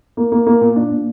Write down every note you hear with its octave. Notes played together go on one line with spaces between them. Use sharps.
A#3
A#3
A#3
A#2
D4
A#2